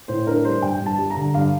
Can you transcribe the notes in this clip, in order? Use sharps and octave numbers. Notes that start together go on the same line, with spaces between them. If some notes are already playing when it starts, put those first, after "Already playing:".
A2 C5
D4 A#4
G3 C5
G2 G5
G2
A5
G3
A#5
D3
G2 F5